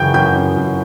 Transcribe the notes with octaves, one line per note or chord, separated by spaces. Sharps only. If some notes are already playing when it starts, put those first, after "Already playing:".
Already playing: F#2 C#3 E3 G5 G6
F#2 G5 G6
F#2
F#2